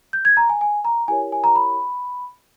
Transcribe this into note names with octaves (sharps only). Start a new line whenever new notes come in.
G6
G#6
A#5
G#5
G#5
A#5
E4 G4 A#4 C#5 G#5
G#5
A#5
B5